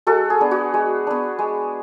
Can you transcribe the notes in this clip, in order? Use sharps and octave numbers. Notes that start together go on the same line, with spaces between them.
G#3 F#4 A4
G#4
B3 D4
F#4
G#3
B3 D4
G#3